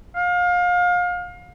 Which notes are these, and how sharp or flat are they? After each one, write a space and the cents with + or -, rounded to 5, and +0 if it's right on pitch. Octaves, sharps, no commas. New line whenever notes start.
F5 +30